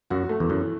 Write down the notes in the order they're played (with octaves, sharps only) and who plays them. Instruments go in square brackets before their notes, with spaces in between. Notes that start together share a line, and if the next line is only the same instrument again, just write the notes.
[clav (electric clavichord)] F#2 [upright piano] F#4
[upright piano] A3
[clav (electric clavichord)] E2
[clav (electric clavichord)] F#2 [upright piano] E3